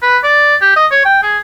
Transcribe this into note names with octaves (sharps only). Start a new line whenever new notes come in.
B4
D5
G4
D#5
C#5
G5
G#4